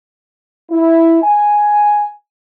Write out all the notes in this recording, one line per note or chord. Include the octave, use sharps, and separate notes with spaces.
E4
G#5